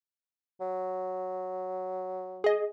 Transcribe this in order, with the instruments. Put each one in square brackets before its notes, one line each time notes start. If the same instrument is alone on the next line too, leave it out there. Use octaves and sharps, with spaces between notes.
[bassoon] F#3
[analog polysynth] G#4 D#5